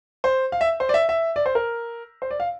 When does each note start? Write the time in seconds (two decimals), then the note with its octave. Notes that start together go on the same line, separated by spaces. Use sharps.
0.24 C5
0.52 F5
0.61 E5
0.80 C5
0.89 D5
0.94 E5
1.09 E5
1.36 D5
1.46 C5
1.55 A#4
2.22 C5
2.31 D5
2.40 F5